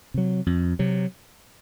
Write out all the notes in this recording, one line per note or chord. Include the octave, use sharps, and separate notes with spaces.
C3 F#3
F2
C3 F#3